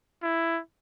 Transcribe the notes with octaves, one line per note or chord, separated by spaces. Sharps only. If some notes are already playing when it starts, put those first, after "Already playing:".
E4